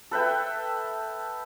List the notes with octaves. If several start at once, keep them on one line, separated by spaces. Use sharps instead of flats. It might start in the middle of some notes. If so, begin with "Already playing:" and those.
A4 B4 E5 G5